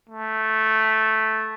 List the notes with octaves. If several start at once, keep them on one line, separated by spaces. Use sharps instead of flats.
A3